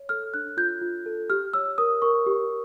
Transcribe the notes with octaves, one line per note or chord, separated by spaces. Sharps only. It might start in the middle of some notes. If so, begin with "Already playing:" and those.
Already playing: C#5
A4 F6
D4 F#6
F4 G6
F4
A4
G4 F6
C#5 E6
A#4 D#6
A#4 C#6
G4